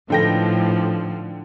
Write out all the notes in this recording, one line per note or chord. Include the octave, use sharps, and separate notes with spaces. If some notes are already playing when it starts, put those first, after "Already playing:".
A2 D3 F3 D#4 A4 B4 G5 A#6